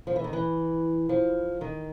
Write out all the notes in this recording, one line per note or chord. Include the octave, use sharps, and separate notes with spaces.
F3
E3
D#3
E3
F3
D#3